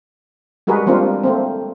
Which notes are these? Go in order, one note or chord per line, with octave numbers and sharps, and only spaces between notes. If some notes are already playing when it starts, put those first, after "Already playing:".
G3 G#3 F#4 G#4 A#4 B4
G3 A#3 C4 D4 F4 A#4
A3 A#3 C4